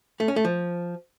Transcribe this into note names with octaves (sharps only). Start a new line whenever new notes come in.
A3
C#4
A3
F3